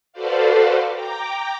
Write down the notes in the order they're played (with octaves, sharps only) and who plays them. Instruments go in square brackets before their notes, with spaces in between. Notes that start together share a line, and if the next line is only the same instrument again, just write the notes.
[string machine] F#4 A4 B4 C5 D5 F5
G5 A#5 D6